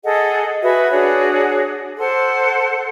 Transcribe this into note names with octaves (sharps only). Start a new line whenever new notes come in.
G#4 A4 D#5 F#5
F#4 G#4 B4 E5
D4 F#4 G#4 C#5
A4 C5 F#5 C6